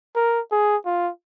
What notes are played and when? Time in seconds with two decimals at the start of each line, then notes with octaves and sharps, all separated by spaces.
0.15 A#4
0.52 G#4
0.85 F4